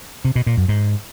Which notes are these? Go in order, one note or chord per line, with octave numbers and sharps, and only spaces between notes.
C3
B2
A#2
F#2
G#2